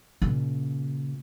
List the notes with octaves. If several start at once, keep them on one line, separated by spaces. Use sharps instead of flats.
A#2 C#3